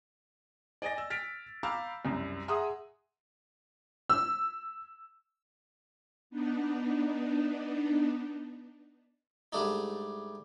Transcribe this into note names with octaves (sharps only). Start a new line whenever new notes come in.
D5 D#5 G#5 A6 A#6
E6
F6 A6 B6 D7
F5 A#5 B5 D6 E6 G6
C2 F#2
G#4 E5 F#5 A#5 C6 D#6
E6
B3 D4 D#4
G#2 G3 A3 D4 D#4